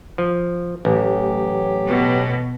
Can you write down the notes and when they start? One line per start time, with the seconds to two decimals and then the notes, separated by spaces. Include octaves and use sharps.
0.18 F3
0.85 A1 F#3 G4
1.87 B2